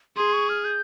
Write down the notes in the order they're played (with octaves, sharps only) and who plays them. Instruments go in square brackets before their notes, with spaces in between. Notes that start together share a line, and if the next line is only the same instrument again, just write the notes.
[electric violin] G#4 [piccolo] C6
[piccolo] C#6
F6
G6